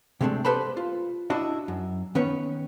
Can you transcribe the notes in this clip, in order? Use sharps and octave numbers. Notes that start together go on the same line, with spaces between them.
C3 G#3 A3 C4 D4
G4 A4 B4 C5 A5 B5
F4
D4 E4 F#4 D#5
F#2
D#3 B3 C#4 B4 C#5